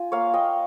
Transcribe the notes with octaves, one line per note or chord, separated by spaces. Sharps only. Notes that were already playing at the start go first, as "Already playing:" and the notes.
Already playing: F4 G#5
A#3 C#5 F5
A#3 D#5 G5